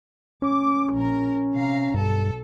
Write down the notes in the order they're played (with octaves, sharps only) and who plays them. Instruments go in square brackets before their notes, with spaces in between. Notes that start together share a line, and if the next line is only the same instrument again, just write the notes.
[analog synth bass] C#4 [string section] D6
[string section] A#1 A#4
C3 F5 A#5
[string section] B1 A4 [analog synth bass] G2